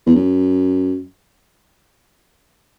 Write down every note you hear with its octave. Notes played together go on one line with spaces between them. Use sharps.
E2
F#2